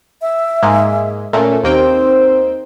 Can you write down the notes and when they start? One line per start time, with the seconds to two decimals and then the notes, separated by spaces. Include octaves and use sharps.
0.22 E5
0.62 G#2 G#3 A#3
1.33 A#2 A3 A#3 C#4 A4
1.64 D#2 A#3 C4 D#4 C5 G5